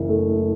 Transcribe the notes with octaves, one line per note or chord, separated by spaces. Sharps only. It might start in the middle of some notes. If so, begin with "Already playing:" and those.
Already playing: F#1 E3
A3